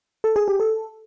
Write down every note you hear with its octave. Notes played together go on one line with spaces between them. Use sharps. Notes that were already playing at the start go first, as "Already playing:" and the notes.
A4
G#4
G4
A4